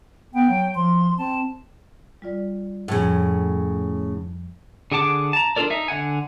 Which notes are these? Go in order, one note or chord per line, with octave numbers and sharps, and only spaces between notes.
B3 G5
F#3
F3 C6
C4 A5
G3 F4 D5
F2 A2 C#3 F3
D3 G#4 F#5 A5 D6
A5 A#5
D4 F4 A4 A#4 D5
D#4 E5
D3 F#5 G#5